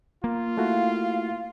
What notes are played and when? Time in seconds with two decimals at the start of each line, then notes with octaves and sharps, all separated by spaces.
0.24 A#3 F4
0.57 A3 E4 F#4 F5